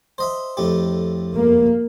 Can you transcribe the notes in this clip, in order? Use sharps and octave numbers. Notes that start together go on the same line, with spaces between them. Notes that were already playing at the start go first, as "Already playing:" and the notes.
C5 D#5 E5
F2 A2 G4
A#3